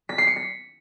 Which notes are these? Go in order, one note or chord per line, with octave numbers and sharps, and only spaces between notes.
B6
C7
C#7
B6